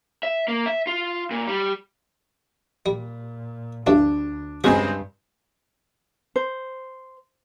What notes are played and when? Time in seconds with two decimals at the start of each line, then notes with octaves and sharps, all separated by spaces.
0.23 E5
0.48 A#3
0.66 E5
0.87 F4
1.31 A#2
1.47 G3
2.86 A#2 G3
3.87 D2 G2 B2 A3 D4
4.64 G2 C#3 G#3 C4 C#4 F#4
6.36 C5